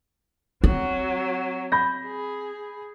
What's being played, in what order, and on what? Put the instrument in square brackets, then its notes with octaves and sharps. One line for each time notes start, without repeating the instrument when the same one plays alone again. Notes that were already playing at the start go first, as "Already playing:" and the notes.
[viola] F#3 [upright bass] C4
[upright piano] B5 G6 A#6
[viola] G#4